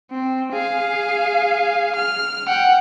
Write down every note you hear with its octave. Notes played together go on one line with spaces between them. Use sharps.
C4
G#4 F5
F6
F#5 G5